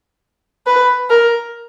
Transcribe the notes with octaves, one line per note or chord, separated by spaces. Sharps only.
B4
A#4